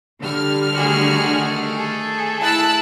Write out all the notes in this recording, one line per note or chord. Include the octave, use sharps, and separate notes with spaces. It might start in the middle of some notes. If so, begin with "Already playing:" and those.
D3 G3 A4 F6
D#3 A3 F#4 G#4
G#4 A4
E4 A5 E6 F#6